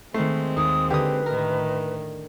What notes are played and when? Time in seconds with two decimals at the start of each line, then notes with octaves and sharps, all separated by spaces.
0.14 D#3 G#3 A3 C4 C7
0.57 D#2 D#6
0.91 D3 G4 B4 D#6
1.26 A2 D#3 A#4 A#5